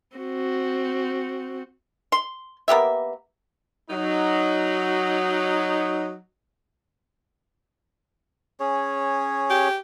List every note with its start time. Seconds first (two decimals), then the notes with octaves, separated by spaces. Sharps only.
0.17 C4 F#4
2.12 C6
2.68 A#3 B3 G4 E5
3.90 F#3 D#4
8.60 C#4 G#4 C#5
9.50 G4